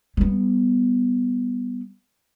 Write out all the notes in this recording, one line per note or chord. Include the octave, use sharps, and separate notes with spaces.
G3 B3